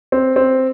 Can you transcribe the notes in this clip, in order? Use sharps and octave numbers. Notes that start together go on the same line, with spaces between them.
C4
C4